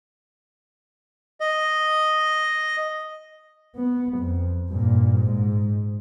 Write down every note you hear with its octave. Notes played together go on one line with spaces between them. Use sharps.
D#5
B3
F2
G2 A#2
G#2